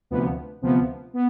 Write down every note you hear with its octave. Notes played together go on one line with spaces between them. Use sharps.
D2 C3 F3 B3
D2 C3 F3 B3
B3